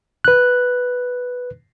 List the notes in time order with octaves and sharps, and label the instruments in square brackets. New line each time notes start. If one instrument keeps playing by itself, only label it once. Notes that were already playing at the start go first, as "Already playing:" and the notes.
[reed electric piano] B4 F#6